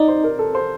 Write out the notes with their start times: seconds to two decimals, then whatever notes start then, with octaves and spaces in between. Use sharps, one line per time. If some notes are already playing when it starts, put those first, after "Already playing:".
Already playing: D#4 D5
0.08 C5
0.24 A#4
0.39 A4
0.55 C5